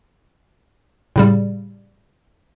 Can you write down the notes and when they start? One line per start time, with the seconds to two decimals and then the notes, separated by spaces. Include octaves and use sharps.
1.16 A2 C#3 G3